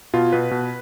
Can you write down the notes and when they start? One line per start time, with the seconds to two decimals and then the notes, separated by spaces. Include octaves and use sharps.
0.14 B2 F4
0.32 B2 B4
0.51 B2